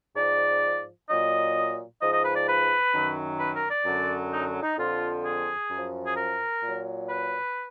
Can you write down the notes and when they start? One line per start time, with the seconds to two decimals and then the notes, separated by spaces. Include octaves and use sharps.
0.16 G#2 F3 D5
1.09 A#2 F#3 D#5
2.01 G#2 F3 D#5
2.12 D#5
2.24 B4
2.35 D5
2.47 B4
2.93 F#2 D#3 F#3
3.40 B4
3.55 A#4
3.70 D5
3.85 F#2 D3 F#3
4.32 D#4
4.62 D#4
4.78 F2 D3 F3 F4
5.25 G#4
5.71 F#2 F3
6.06 G#4
6.17 A#4
6.63 A#2 F#3
7.09 B4